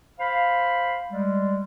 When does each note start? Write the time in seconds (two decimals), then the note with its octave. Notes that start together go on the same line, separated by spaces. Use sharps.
0.19 C5 F5 B5
1.10 G3 G#3